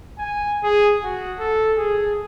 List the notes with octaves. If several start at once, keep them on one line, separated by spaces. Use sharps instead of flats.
G#5
G#4
F#4
A4
G#4